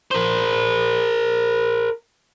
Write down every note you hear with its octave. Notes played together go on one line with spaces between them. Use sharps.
A#4 C5